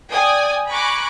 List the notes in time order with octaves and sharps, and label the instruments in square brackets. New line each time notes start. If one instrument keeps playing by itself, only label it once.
[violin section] D5 G5 G#5 D#6
G#5 A#5 B5 C#6 D6 F#6